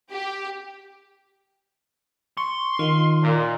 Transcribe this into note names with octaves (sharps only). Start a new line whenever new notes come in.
G4
C6 C#6
D#3 F4 D#5 F5
A#2